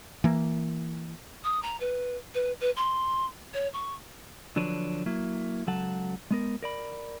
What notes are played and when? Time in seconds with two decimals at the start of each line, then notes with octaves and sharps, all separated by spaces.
0.24 E3 A#3
1.44 D#6
1.63 A#5
1.80 B4
2.34 B4
2.61 B4
2.77 C6
3.54 C#5
3.73 C#6
4.56 D3 F3 F#3 D4 B4 C#5
5.06 F#3 A#3 E4
5.67 C#2 C#3 F#3 A4 F#5 A5
6.31 G#3 B3 A#4
6.63 A#4 D5 B5